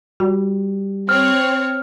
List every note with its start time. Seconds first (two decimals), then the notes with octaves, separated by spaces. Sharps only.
0.20 G3 F#4
1.09 C4 C#5 F6